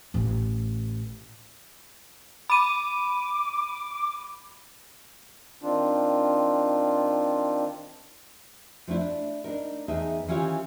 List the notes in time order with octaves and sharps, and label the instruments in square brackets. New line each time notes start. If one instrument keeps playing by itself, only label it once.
[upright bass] A1
[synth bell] B5 D#7 [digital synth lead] D6
[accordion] D#3 C4 D4 F4
[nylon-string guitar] F3 A3 D4 E4
D4
D4 D#4 A#4
E2 D#4 G#4 E5 A5
D#3 E3 C#4 F4 G4